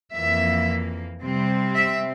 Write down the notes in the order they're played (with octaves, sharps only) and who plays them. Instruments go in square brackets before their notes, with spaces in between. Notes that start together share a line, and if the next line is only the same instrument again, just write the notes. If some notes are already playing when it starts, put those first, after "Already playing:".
[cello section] F2 E3 A#3 E5
C3 G3 C4
E5